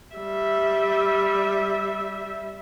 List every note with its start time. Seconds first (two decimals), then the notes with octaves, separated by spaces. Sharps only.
0.16 G3 E5